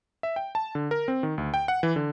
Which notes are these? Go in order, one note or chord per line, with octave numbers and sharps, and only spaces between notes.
E5
G5
A5
D3
A#4
C4
D#3
D2
G5
F#5
E3
D3